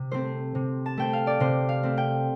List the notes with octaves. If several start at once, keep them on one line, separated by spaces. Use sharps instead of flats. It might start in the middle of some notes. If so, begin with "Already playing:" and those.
Already playing: C3
A3 C4 C5
C3
A5
A3 C4 G5
F5
D5
C3 C5
F5
A3 C4
G5